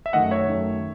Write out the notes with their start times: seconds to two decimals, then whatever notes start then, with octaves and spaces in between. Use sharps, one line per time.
0.06 E5
0.13 F#2 D#3 A3 D#5 F#5
0.31 C#5 E5
0.49 F#2 D#3 A3